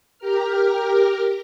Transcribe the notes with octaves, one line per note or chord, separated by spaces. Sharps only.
G4 A#4 F6